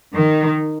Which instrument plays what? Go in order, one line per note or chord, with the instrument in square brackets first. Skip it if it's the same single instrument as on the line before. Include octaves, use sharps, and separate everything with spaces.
[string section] D#3